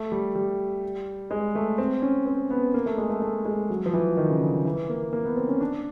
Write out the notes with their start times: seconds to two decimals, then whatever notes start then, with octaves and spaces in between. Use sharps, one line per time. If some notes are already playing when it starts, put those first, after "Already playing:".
Already playing: A3
0.12 G3
0.35 G3
1.31 G#3
1.55 A3
1.78 C4
2.02 C#4
2.26 C4
2.50 B3
2.74 A#3
2.86 A3
2.98 G#3
3.10 A3
3.22 A3
3.45 G#3
3.70 F#3
3.86 F3
3.93 E3
4.17 D#3
4.30 C#3
4.42 D3
4.65 E3
4.89 A#3
5.13 A#3
5.25 B3
5.37 C4
5.48 C#4
5.61 D4